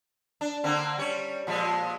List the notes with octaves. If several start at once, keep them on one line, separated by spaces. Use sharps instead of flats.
D4
D3 A#3 C4
G3 C#4 C#5
A#2 F3 G#3